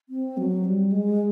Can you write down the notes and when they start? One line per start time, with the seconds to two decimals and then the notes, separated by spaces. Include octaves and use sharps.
0.09 C4
0.37 F#3
0.65 G3
0.92 G#3